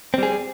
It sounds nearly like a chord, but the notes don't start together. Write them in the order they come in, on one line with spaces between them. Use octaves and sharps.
C4 G3 G#4